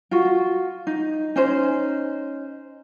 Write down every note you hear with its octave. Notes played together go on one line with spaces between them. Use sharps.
F4 F#4
D#4
C#4 D#4 C5